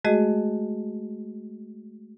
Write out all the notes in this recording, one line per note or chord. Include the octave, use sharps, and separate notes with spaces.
G#3 A3 F#4 G#4 D#5